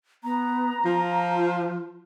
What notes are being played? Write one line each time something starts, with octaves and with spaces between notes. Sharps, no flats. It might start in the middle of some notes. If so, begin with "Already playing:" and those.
B3 A#5
F3 F4